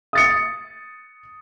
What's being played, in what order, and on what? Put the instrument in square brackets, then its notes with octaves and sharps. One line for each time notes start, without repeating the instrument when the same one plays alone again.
[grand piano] D#6 A6 C#7